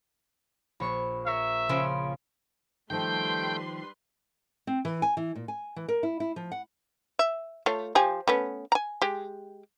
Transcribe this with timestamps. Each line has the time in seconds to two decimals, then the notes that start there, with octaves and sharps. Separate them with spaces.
0.80 A#1 C#5 B5 C#6
1.27 A#4 C#5 E5 A#5 C#6
1.69 C#3 F3 C#4 B5 C6 D7
2.90 D#3 F3 G3 A3 B4 G5 C6 G6
4.67 C4
4.85 E3
5.02 G#5
5.17 E3
5.35 A#2
5.48 G#5
5.76 E3
5.88 A#4
6.03 E4
6.20 E4
6.36 F3
6.52 F#5
7.19 E5
7.66 A3 F4 C#5
7.95 F3 G4 G#5
8.28 A3 B3 C#4
8.72 G#5 A#5
9.02 G#3 G4